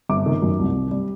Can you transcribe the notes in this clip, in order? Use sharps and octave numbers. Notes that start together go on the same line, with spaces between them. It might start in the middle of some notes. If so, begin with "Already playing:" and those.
G1 D6
D#3
F#2
C2
C4
G3